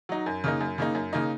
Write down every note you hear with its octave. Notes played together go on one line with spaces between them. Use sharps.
F#3 D#4
F#2
C#3 A#3 D#4
F#2
C#3 A#3 D#4
F#2
C#3 A#3 D#4